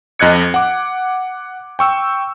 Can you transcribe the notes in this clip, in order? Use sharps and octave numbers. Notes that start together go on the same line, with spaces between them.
F2 D#5 F#6 G#6 C#7
F#5 D6
G5 C#6 E6